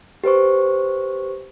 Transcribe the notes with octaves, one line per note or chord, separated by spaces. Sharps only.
G4 B4 C5 C#6